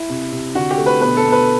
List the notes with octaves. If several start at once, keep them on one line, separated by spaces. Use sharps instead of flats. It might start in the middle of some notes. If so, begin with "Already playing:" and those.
Already playing: E4
C3
C3
D3 F#4
G4
A3
B4
B2 B4
A4
B2
B4